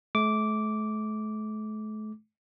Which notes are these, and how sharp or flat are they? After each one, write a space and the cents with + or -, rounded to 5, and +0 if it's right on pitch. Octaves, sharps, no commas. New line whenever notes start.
A3 -40 D6 -10